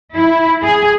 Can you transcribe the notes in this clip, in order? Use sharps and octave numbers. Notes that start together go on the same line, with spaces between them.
E4
G#4